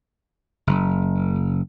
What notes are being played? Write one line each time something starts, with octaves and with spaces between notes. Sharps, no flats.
F#1